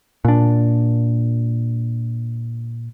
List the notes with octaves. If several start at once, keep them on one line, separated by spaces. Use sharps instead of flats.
A#2 D4